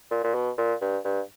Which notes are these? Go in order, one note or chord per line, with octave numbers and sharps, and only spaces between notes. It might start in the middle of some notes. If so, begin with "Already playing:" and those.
A#2
A#2
B2
A#2
G2
G2